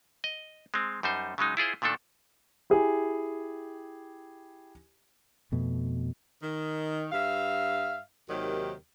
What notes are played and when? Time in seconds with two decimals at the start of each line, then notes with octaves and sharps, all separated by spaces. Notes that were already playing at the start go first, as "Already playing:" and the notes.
0.24 D#5
0.74 G#3 C4
1.03 F#2 G3 D#4 C5
1.38 C#3 F#3 G#3 D#4
1.57 E4 F4 G#4 C5
1.82 A#2 D#3 A3 D4 A4
2.70 E4 G4 G#4
5.52 F2 B2 A3
6.42 D#3
7.12 G2 E5 F5
8.29 D#2 C3 D#3 F#3 G4